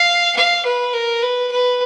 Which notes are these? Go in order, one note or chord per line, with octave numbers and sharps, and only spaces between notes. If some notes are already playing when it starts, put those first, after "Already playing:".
Already playing: F5
F5
B4
A#4
B4
B4